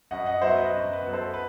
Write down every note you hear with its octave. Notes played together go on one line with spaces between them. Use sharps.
F#2 D#5 F#5
D#5 F#5
F#3 B3 C5 E5
B4 D#5
F#2
B4
F#3 B3
A4 C5
B4